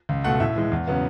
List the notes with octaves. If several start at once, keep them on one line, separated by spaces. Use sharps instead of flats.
C#2
B2 A3 F#5
A2 E5
E3 G#3
E2
C#3 F#3 B3